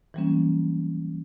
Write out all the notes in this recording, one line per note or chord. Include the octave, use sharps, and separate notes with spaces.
E3 F#3 G3 A#3 C4 C#4